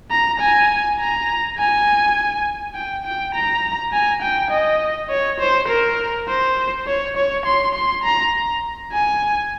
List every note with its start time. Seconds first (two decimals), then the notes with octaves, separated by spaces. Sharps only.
0.11 A#5
0.40 G#5
0.99 A#5
1.57 G#5
2.75 G5
3.05 G5
3.35 A#5
3.93 G#5
4.22 G5
4.51 D#5
5.10 C#5
5.40 C5
5.69 A#4
6.29 C5
6.87 C#5
7.17 C#5
7.46 C6
7.75 C6
8.04 A#5
8.93 G#5